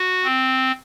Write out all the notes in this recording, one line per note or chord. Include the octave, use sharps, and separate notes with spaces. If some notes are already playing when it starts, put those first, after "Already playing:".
Already playing: F#4
C4